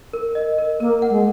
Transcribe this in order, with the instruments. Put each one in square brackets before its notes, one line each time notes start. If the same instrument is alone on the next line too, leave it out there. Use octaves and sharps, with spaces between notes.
[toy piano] A#4
D#5
A#4
[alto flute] A#3 [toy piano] A#4
[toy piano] F#5
[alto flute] G#3